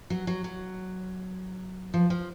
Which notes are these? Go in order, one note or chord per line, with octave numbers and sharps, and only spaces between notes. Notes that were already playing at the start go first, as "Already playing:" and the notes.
F#3
F#3
F#3
F3
F3